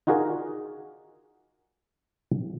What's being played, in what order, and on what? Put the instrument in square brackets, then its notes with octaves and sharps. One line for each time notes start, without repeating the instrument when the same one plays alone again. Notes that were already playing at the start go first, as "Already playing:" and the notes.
[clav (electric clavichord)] D#4 F4 F#4 G#4 A#4 D5